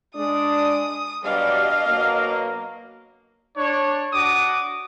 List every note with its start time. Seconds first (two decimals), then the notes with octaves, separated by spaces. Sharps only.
0.15 G#3 D4 D#6
1.24 B2 F#3 G3 D4 D#5 F5
1.86 B2 F#3 A#3
3.57 D4 C#5
4.12 D4 F#4 D6 D#6